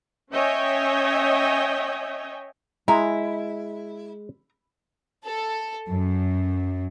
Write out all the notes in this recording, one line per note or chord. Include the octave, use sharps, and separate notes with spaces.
C#4 C#5 D#5 E5 G5 G#5
G#3 E4 A#5
A4
F#2